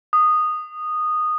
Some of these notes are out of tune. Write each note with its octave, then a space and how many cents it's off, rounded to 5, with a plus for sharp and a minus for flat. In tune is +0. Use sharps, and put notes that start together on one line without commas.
D#6 -15